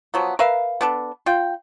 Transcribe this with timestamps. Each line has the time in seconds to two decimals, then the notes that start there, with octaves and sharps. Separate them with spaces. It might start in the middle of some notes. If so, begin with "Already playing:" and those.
0.14 F3 F#3 B3
0.39 A#4 B4 E5 F5
0.81 B3 D4 A4
1.26 F4 G5